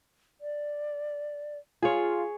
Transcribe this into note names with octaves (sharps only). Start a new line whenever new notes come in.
D5
F4 G#4 C#5